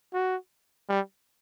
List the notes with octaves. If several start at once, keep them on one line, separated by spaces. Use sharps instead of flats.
F#4
G3